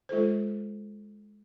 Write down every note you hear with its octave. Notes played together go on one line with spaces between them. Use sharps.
G#3 F4 A4 C5